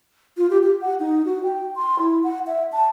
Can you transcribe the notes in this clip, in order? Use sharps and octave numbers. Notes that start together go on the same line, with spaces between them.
F4
G4
G4
F#5
D#4
F#4
G5
C6
E4
F#5
E5
A5